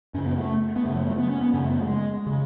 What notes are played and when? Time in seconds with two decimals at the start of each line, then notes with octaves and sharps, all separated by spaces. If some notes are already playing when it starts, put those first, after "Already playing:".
0.14 F#2 C#4
0.17 C#3
0.26 B3
0.38 A3
0.76 B3
0.84 F#2 C#3 A3
0.96 F#3
1.06 A3
1.18 B3
1.29 C#4
1.41 B3
1.53 F#2 C#3 C#4
1.64 A3
1.71 B3
1.83 A3
1.87 G#3
2.27 C#3